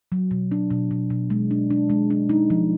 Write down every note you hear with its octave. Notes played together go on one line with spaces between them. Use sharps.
F#3
B2
D4
B2
B2
B2
G#3
D4
D4
G#3
D4
D#4
F3